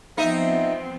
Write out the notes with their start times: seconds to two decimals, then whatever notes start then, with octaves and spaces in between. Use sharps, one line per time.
0.17 F3 B3 C4 D#4 D#5 E5